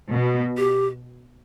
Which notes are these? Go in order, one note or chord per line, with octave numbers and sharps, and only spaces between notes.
B2
G4